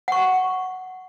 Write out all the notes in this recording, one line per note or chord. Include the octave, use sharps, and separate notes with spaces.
F#5 C#6